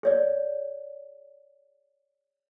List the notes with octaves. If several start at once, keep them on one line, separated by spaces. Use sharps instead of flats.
G#4 C#5 D5